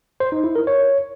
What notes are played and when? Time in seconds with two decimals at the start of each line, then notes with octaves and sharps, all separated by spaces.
0.20 C5
0.32 D#4
0.44 E4
0.55 A#4
0.67 C#5